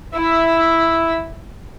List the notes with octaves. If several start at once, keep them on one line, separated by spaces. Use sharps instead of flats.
E4 E5